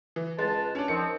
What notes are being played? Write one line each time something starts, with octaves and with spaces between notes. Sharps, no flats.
E3
C#2 G#3 B4 A5
C#4 D4
D#3 F3 C4 C#7